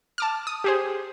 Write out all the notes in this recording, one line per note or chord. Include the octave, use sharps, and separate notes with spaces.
A5 D6 F6
D#6
G4 G#4 C5